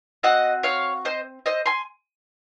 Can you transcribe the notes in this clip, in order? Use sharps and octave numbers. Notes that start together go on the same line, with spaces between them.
C4 F#4 D#5 F#5
C#5 F5
C5 D#5
C5 D#5
G#5 C6